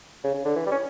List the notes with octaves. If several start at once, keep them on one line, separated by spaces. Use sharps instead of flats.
C#3
C#3
D3
E3
G3
C#4